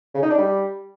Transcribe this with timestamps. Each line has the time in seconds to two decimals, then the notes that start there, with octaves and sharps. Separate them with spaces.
0.15 C#3
0.22 D#4
0.30 D4
0.38 G3